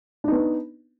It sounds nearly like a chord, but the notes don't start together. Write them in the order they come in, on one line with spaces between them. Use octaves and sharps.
D4 D#4 B3